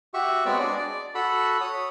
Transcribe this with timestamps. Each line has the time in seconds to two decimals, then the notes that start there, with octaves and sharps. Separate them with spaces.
0.14 F#4 G4 E5 C#6
0.46 G#3 B3 C4 F#4 C#5 D5
0.59 D4 G#4 D5 D#5
0.77 D5
1.15 F#4 A4 B5
1.61 C#5 D#6